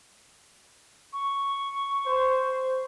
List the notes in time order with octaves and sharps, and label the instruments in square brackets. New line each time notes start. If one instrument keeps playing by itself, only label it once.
[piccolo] C#6
[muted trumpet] C5